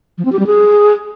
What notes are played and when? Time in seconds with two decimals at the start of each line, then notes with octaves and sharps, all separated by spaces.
0.18 F3
0.25 C4
0.32 G4
0.39 G3
0.46 G#4